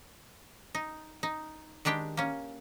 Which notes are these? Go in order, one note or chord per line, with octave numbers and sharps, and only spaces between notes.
D#4
D#4
D#3 G#3 D4 G4 G5
A#3 C#4